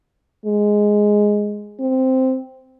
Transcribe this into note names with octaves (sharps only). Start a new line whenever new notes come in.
G#3
C4